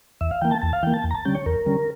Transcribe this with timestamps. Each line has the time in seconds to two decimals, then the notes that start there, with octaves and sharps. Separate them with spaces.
0.21 E2 E5
0.31 F5
0.41 E3 A#3 G5
0.51 A5
0.62 E2 A5
0.73 F5
0.83 E3 A#3 G5
0.94 A5
1.04 E2
1.11 A#5
1.15 A5
1.25 D3 G3 C#4 G5
1.35 C#5
1.46 E2 A#4
1.66 D3 G3 C#4